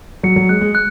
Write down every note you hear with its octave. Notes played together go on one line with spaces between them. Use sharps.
F#3 C#7
F#3
G#3 F#6
G#3
F#6